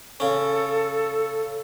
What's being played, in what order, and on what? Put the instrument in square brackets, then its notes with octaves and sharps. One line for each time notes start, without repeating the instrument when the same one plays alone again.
[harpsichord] C#3 C#4 [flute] A4